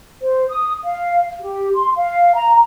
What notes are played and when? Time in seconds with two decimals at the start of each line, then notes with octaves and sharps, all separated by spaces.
0.22 C5
0.48 D#6
0.84 F5
1.40 G4
1.75 C6
1.97 F5
2.35 A#5